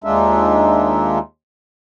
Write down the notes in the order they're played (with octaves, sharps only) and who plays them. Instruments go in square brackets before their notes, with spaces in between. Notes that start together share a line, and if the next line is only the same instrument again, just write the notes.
[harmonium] D#2 G#3 D4 D#4 F4 E5